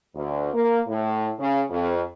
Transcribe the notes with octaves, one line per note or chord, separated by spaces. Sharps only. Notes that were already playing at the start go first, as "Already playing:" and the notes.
D2
A#3
A2
C#3
F2